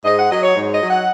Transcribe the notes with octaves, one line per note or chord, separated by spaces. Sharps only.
G#2 D#5
F#5
F#3 D#5
C#5
G#2
D#5
F#3
F#5